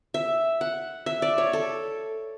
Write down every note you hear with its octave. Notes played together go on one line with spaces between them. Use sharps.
E5
F#5
E5
D5
C#5
A4